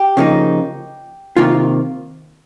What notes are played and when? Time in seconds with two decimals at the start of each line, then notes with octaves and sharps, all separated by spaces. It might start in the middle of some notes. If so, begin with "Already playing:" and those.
Already playing: G4
0.17 C#3 F3 A#3 D#4
1.37 C3 D#3 A#3 F4